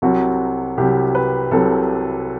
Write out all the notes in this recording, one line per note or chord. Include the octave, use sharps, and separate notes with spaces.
C2 C3 F#3 F#4
C2 C3 F#3 G4
B4
C2 C3 F#3 A4